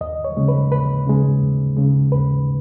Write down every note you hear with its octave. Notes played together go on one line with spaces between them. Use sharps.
D#2 D#5
C#5
C#3 G#3
B4
D#2 B4
C#3 G#3
D#2
C#3 G#3
D#2 B4